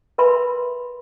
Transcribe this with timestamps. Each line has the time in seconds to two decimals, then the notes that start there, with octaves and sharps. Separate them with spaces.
0.18 A#4 B4 E5 B5 C6